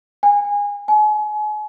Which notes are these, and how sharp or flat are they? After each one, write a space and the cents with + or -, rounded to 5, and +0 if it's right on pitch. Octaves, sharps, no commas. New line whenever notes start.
G#5 -25
G#5 +35